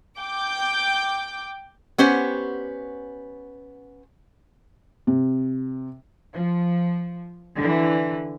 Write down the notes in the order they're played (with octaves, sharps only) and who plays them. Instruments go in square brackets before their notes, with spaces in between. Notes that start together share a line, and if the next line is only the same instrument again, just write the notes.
[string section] G5 D6 G6
[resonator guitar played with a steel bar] B3 C#4 G4 C5 F#5
[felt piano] C3
[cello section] F3
D3 E3